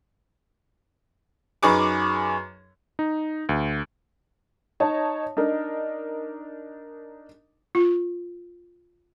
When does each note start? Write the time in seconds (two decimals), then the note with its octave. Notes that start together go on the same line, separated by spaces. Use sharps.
1.63 F#2 D#4 G#4 B4 C#6 D6
2.99 D#4
3.49 D2
4.80 D#4 C#5 D#5 A5
5.37 D4 D#4 A#4 D#5
7.75 F4